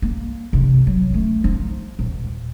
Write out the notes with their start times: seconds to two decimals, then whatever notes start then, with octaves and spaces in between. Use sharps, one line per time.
0.02 A#3
0.53 C3 D4
0.87 F#3
1.10 A3 C#4
1.44 F3 D#4
1.99 D#1